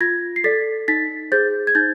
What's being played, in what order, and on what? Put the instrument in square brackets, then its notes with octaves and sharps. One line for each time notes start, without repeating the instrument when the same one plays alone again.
[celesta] F4 G#6 A#6
C7
A4 D5 A6 B6
D#4 A6 B6
G#4 C5 G6 A6
G#6
D#4 G6 A6